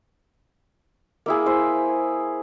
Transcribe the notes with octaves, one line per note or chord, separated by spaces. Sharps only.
A#3 E4 G#4
E4 C5